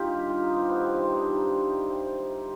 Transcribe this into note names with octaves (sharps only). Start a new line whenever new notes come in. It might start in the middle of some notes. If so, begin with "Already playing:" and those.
Already playing: G2 D#4 F4 G4
D#3
D#3 F4
D#4
D#3
C4
G3 B3
C4
G2
C4
C3 D#4
D4
G3 D#4
G3
C3
C3 C4
D#3
C3